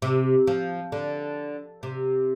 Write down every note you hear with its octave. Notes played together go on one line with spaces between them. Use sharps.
C3
F3
D3
C3